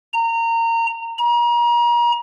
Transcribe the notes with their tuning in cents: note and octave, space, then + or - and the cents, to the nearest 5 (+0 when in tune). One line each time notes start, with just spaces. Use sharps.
A#5 -25
A#5 +35